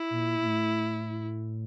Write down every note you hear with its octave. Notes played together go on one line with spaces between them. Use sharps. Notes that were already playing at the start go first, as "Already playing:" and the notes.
Already playing: E4
A#2
A#2
A2